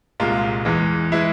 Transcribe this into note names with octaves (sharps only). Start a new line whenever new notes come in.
C2 A#2 G#3 F4
E2 E3 G#3
E3 G#3 E4